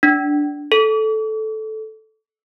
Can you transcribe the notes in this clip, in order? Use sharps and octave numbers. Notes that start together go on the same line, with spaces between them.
D4
A4